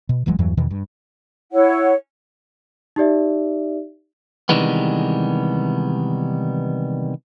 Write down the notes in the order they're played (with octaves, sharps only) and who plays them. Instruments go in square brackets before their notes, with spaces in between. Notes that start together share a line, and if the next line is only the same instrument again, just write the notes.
[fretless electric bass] B2
D1 E3 F#3 G#3
E2 G2 E3 F#3
E2 B2 D#3 E3
G2
[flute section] E4 C#5 F#5
[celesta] D#4 G4 D5 E5
[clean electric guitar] C3 D#3 E3 G3 G#3 B3